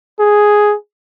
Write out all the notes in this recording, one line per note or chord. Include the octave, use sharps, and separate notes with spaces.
G#4